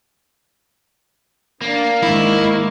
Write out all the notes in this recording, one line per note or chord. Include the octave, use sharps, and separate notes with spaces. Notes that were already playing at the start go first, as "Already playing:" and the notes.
A#3 D4
G#2 D#3 E4